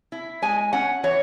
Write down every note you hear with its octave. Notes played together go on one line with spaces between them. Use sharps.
E4
G#3 G#5
C#4 F#5
E3 C#5